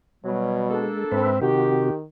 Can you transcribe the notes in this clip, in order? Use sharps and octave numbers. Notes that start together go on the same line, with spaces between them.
B2 F#3 G3
G#3 A#3 D4 A4
G#2 C4 B4 E5
C3 D#3 F#4 G4